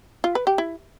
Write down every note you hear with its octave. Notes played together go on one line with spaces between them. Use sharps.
F4
B4
G4
E4